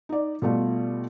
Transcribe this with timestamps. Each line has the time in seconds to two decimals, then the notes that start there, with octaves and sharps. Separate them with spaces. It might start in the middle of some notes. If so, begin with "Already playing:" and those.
0.09 D#4 D5
0.42 B2 G3 A3 F4